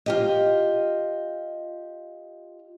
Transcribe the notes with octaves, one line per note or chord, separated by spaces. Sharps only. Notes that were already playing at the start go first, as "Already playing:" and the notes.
F4 G4 D#5